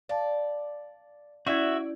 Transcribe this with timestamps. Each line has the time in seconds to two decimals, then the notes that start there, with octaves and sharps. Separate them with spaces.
0.09 D5 F5 A5
1.47 C#4 E4 F#4 D5 E5 G5 G#6